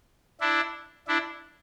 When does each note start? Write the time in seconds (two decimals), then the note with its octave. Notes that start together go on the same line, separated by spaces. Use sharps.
0.40 D4 E4
1.08 D4 E4